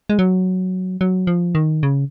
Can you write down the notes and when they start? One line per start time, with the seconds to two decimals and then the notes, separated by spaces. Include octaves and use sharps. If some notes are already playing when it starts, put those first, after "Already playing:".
0.10 G#3
0.19 F#3
1.01 F#3
1.27 F3
1.55 D#3
1.83 C#3